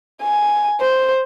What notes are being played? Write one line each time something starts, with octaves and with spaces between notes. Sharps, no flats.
G#5
C5